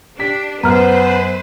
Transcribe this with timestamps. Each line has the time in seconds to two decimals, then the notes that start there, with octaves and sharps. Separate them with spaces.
0.19 D4 G4 B6
0.63 F#2 B3 B4 C5 A#5 F6